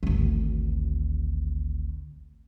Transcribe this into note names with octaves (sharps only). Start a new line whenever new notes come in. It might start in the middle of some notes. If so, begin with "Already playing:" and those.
G#1 D2